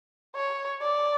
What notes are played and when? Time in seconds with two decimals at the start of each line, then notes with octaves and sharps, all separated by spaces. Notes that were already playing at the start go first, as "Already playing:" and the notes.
0.35 C#5
0.81 D5